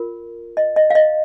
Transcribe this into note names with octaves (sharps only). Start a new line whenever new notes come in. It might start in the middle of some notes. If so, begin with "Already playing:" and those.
Already playing: F4 A#4
D#5
D#5
F5
D#5